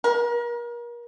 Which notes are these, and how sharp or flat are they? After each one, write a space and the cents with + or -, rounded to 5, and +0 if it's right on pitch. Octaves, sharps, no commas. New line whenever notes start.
A#4 +35